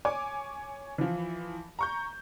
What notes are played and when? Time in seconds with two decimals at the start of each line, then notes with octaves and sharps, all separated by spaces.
0.05 C#5 G#5 D6
0.98 E3 F3
1.79 A#5 C#6 G6